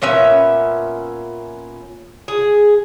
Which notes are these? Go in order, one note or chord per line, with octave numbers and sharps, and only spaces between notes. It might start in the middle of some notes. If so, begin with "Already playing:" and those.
A#2 B3 C#4 E5
G#4